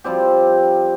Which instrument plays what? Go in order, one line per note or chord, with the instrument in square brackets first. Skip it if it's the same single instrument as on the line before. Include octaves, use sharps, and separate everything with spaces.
[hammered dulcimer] F3 G3 C4 G4